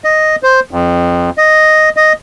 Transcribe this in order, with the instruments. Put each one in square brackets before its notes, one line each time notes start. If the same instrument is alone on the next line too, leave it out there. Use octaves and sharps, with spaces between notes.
[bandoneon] D#5
C5
F2
D#5
D#5